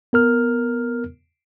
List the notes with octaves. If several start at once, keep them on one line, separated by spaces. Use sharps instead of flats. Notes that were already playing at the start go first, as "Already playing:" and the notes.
B3 A#4 F6